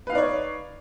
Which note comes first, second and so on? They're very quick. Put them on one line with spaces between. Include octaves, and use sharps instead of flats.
B4 F5 D#4 D5 C#5